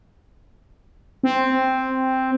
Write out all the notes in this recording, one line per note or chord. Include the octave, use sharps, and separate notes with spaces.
C4